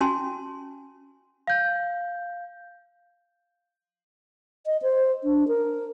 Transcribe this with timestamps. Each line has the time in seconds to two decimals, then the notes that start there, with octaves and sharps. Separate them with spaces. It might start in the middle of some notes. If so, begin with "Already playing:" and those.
0.01 C#4 F#4 G#5 A5 C6
1.47 F5 G6
4.66 D#5
4.82 C5
5.24 D4
5.48 A#4